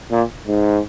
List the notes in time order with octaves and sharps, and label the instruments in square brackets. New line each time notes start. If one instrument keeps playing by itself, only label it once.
[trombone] A#2
G#2